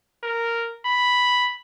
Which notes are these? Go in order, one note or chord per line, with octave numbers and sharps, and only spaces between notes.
A#4
B5